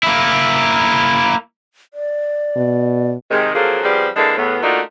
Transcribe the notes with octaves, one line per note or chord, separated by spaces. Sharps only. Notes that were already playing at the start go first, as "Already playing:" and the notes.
A#3 E4
D5
B2
C3 D#3 G#3
F3 F#3 A#3 C4 G#4 A4
F3 G3 B3 C4 G#4 D5
D3 E3 G#3 A#3 D4 A4
E2 A2 B3
A3 A#3 D4 D#4 F4 F#4